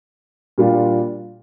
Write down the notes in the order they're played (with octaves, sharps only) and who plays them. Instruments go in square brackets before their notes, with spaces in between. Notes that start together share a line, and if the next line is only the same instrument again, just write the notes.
[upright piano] A#2 G3 D4 F4